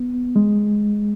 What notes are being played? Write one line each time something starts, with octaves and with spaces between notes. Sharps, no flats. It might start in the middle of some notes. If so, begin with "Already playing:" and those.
Already playing: B3
G#3